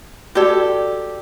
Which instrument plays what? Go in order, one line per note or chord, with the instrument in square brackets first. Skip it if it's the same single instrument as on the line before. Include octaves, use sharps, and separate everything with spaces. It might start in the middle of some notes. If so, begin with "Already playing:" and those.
[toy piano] F#4 D5 [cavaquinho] G4 A4